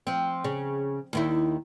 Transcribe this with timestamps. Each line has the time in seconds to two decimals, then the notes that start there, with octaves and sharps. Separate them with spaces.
0.07 F3 C4
0.44 C#3
1.13 D#2 D#3 E4